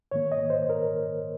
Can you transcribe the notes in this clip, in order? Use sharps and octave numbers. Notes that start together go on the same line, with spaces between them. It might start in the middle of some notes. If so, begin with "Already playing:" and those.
G#2 D#3 A#3 C#5
D#5
C5
A#4